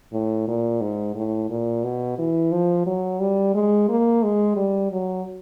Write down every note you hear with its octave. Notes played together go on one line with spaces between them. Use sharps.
A2
A#2
G#2
A2
A#2
B2
E3
F3
F#3
G3
G#3
A#3
G#3
G3
F#3